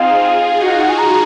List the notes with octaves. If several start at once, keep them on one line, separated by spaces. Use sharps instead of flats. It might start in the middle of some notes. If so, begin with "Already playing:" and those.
Already playing: C4 D#4 F4 G#4 F5
F4 G#4
D#4 F#4 F#5
F5
F#5
G#5
A#5